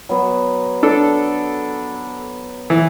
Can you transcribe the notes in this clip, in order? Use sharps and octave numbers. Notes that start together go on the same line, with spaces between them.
F#3 B3
D4 A4
E3